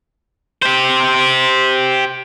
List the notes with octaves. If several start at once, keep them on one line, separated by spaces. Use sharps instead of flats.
G4 C5